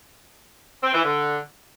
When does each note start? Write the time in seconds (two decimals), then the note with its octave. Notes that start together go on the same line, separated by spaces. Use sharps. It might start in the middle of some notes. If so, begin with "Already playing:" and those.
0.83 C4
0.94 E3
1.05 D3